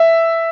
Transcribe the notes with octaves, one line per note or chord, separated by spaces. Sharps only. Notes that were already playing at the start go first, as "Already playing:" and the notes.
Already playing: E5